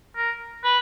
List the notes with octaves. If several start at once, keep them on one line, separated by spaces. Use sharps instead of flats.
A#4
B4